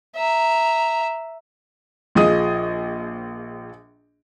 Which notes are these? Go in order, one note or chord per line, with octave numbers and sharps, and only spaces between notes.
E5 A#5
A#1 F3 G#4 D#5 D#6